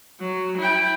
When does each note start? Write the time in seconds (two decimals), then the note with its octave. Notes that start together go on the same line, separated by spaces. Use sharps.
0.20 F#3
0.58 E4 G5